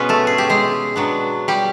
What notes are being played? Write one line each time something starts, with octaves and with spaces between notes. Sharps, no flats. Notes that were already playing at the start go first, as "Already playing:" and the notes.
Already playing: B2 G#3 B3 C#4 B4
A3 A4
G#4
G4
G#3 G#4
F#3 B3 D4
G3 G4